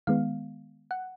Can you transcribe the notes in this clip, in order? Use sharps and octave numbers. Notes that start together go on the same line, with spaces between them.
D#3 G#3 B3 F5
F#5